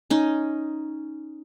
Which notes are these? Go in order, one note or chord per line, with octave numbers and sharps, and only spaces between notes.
C#4 D#4